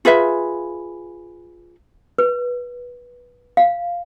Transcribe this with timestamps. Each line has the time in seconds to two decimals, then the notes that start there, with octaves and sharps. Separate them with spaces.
0.05 F4 G#4 B4 E5
2.18 B4
3.57 F5